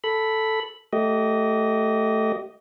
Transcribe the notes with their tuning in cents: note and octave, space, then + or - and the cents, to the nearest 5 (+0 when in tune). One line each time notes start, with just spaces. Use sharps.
A4 +0 B5 +0
A3 +0 G4 -30 D#5 +0